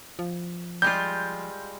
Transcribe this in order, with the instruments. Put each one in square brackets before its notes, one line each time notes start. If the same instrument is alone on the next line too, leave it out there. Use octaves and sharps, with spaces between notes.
[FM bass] F3
[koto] G3 G#3 F4 [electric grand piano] G6